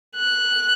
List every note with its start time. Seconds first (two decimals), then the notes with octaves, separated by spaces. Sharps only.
0.17 F#6